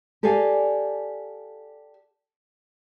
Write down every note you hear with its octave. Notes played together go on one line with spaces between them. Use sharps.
G4 A4 D5 F5 G#5